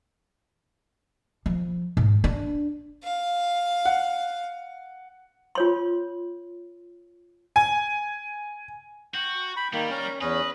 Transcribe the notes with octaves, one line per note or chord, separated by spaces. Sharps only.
F3
G#2
D4
F5
F#5
F4 C#5 C6
G#5
F#4 G5
G5 B5
D#3 G3 A#3
C#4 A#4
E2 C#4 B4 D#5